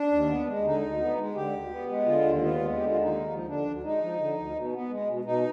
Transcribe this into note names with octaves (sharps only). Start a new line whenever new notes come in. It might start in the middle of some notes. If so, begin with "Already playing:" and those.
Already playing: D4
D#2
B3
G#3
D3 D#4
D2
B3
G#3
D3 G4
D2
B3
G#3
D3 F4
D#2
B3 F4
G#3
D3 G4
F4
D#2
D#4
G#3
F3
D3 D4
D2
G#3 D#4
F3
D3
D2
B2
B3
G#3
B2
B2 D#4